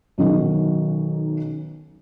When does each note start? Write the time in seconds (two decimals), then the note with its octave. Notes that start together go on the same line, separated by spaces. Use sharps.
0.18 B1 D#3 C#4 F#4